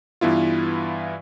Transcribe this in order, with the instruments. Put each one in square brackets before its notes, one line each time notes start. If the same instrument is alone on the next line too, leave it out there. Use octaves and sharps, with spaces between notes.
[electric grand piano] G2 E3 B3 E4 F4